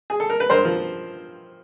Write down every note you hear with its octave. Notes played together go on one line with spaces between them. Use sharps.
G#4
A4
A#4
B4
G2 A#4 C5
F3